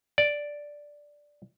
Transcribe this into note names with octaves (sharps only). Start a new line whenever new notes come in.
D5